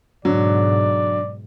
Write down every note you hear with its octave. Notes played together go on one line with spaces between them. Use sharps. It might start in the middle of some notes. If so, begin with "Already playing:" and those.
G#2 B2 D3 F#3 D5